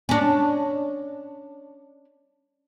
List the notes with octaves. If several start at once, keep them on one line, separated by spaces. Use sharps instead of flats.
C#4 D4